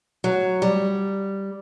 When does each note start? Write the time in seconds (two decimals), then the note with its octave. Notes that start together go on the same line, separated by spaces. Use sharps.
0.24 F#3
0.62 G3